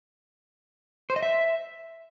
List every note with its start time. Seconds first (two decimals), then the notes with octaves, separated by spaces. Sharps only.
1.10 C5
1.16 D#5
1.23 E5